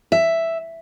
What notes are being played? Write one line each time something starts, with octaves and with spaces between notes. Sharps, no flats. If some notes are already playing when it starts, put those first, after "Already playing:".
E5